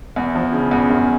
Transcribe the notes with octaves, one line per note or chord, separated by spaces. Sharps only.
E2
F3
C#3
E2
F#2